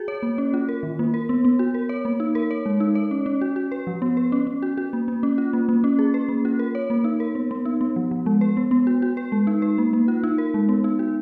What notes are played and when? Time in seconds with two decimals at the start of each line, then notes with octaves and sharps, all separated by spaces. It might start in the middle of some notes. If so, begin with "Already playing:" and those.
Already playing: F#4 G#4
0.08 C#5
0.23 A#3
0.38 C#4
0.54 F4
0.69 A#4
0.83 D#3
0.99 A#3
1.14 A#4
1.29 B3
1.45 B3
1.59 F#4
1.74 A#4
1.89 C#5
2.05 A#3
2.20 D#4
2.35 A#4
2.51 C#5
2.66 G#3
2.80 D#4
2.95 C#5
3.11 C#4
3.26 C#4
3.41 F#4
3.56 F#4
3.72 B4
3.87 F3
4.02 B3
4.17 B4
4.32 C#4
4.47 C#4
4.63 F#4
4.78 F#4
4.93 A#3
5.08 A#3
5.23 C#4
5.38 F4
5.53 A#3
5.69 A#3
5.84 C#4
5.99 G#4
6.14 B4
6.29 A#3
6.45 F4
6.59 A#4
6.75 C#5
6.90 A#3
7.04 D#4
7.20 A#4
7.35 B3
7.51 B3
7.65 D#4
7.81 B3
7.96 F3
8.11 F3
8.26 G#3
8.41 B4
8.57 B3
8.71 B3
8.87 F#4
9.02 F#4
9.17 B4
9.32 G#3
9.47 D#4
9.62 B4
9.78 A#3
9.93 A#3
10.08 F4
10.24 D#4
10.38 A#4
10.54 G#3
10.69 B3
10.84 D#4
10.99 F#4